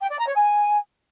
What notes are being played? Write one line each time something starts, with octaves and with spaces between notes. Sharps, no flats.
G5
D5
A#5
C#5
G#5